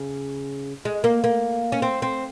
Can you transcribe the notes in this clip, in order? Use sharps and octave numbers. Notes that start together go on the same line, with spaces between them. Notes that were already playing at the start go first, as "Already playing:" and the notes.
Already playing: C#3
G#3
A#3
A#3
C#4
C4
C4